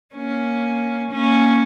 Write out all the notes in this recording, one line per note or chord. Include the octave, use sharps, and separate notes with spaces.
A#3 C#4
A#3 C#4